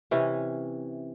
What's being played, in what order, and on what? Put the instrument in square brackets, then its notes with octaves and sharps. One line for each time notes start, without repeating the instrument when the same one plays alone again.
[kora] C3 E3 C#4